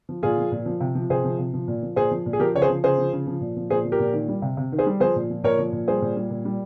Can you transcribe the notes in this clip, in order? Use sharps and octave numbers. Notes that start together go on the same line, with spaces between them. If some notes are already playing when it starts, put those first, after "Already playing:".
F3
A#2 F4 G#4
F3
A#2
F3
C3
F3
C3 G#4 C5
F3
C3
F3
A#2
F3
A#2 G#4 C5
F3
A#2
G#4
F3 G4 A#4
C#3 C#5
G#4 C5
F3
C#3 G#4 C5
F3
C#3
F3
A#2
F3
A#2 G#4 C5
F3
G4 A#4
A#2
D#3
G3
C3
C3
D#3
G#4 C5
G3
F3 G#4 C5
A#2
F3
A#2 A#4 C#5
F3
A#2
G3 G#4 C5
A#2
G3
A#2
G3